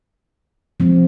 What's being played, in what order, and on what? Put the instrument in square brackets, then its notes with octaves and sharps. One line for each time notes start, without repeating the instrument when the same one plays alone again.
[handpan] F3 G#3 C4